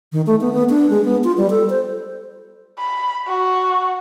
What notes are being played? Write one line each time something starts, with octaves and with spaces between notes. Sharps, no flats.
D#3
A3
B3
B3
D4
G#3
B3
F4
G3
A4
C5
B5
F#4